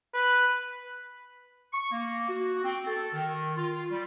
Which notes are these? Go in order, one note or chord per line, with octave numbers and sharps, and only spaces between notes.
B4
C#6
A#3
F#4
C4
A4
D#3
F4
G3